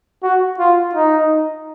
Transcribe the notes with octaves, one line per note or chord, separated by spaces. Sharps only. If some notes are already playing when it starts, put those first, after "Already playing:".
F#4
F4
D#4